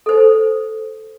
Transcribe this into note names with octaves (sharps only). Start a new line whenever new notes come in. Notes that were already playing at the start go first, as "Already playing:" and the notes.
A4 C5